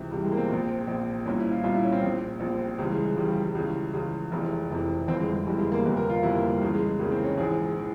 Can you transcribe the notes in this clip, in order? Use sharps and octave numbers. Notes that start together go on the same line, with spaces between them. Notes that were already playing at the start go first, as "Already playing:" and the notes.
Already playing: C#2 C3 E3
C#2 C3 E3 G3
G#3
A#3
C4
A#1 A#2
A#1 A#2
C2 A#2 C#4
E4
F4
C2 A#2 F4
E4
C#4
C4
A#1 A#2
A#1 A#2
C4
C#2 C#3 E3 G3
G#3
G#3
C#2 C#3 E3 G3
G3
G3
C#2 C#3 E3
C#2 C#3 E3
F1 F2 C3 E3 G#3
F1 F2 C3 E3
G1 F2 E3 C4
G#3
G#3
G1 F2 E3 G3
G#3
A#3
G1 F2 C3
A#4
F4
G1 F2 C3 E4
A#3
G3
C#2 C#3 E3 G#3
G#3
G#3
C#2 C#3 E3 A#3
C4
C#4
A#1 G#2 E3 G#4
E3